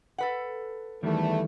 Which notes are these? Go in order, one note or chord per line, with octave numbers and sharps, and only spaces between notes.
A4 B4 F#5
E2 D#3 E3 G3 A3